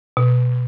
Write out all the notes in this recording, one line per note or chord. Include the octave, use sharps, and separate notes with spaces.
B2